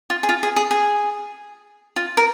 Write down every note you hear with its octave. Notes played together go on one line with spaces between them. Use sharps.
F4
G#4
F4
G#4
G#4
G#4
F4
A#4